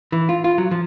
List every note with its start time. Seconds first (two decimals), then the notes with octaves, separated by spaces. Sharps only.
0.12 E3
0.29 F4
0.44 F4
0.58 F#3
0.71 F3